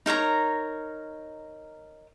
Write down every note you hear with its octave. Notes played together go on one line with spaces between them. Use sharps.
D#4 A#4 C#5 A#5